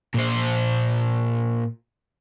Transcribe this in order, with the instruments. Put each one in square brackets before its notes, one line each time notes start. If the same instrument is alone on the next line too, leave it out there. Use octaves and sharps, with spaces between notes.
[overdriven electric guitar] A#2 C5